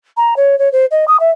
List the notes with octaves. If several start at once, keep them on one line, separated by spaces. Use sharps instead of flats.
A#5
C#5
C#5
C5
D#5
D#6
E5